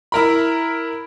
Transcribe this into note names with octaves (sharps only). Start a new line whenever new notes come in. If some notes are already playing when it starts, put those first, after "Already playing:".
E4 A#4 B5